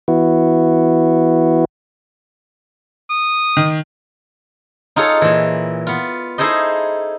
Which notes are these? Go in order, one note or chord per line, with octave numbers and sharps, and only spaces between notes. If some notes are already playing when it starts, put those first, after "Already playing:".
E3 B3 E4 F#4
D#6
D#3
D#4 F4 G#4 A4 C#5
A#2 E3
B3 F4
D#4 E4 G#4 A4 C5 D#5